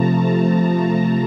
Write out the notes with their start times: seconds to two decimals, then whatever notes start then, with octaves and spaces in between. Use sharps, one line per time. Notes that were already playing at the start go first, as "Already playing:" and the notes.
Already playing: C3 F3 A3 A5 A#5
0.24 A#5